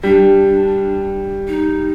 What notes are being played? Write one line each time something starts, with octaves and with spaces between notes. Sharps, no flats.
G3 D4
D#4